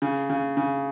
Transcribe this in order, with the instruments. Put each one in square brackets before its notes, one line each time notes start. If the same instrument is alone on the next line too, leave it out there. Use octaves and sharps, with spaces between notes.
[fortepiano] C#3
C#3
C#3